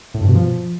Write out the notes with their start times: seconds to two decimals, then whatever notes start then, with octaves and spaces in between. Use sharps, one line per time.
0.14 A2
0.21 G2
0.28 B2
0.35 F3